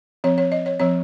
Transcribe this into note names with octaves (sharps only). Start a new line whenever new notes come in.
F3 C4 C#5
C#5
D#5
C#5
F3 C4 C#5